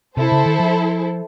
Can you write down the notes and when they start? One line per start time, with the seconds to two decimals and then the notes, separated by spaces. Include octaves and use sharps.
0.17 C3 E4 A4 C5
0.32 C#3
0.46 D#3
0.60 F3